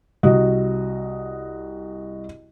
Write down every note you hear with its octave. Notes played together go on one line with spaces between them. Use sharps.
C2 F#4 D#5